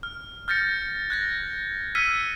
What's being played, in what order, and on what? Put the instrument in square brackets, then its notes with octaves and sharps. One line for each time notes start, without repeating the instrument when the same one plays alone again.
[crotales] F6
F6 G6 A6 A#6 C#7
F#6 G#6 A#6
E6 F6 G#6 B6 C#7 D#7